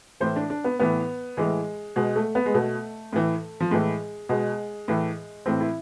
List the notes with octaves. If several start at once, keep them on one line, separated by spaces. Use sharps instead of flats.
A2 E3 C5
D4
D4
B3
A2 E3 B3
A2 E3 G#3
B2 G#3
A3
B3
G#3
B2 A3
A2 E3
F3
A2 E3 G#3
B2 G#3
A2 E3
A2 E3 C4
E4